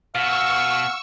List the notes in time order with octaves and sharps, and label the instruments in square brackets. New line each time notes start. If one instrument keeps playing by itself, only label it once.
[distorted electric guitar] B2 [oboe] F5 [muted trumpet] F#5 [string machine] C#6 E6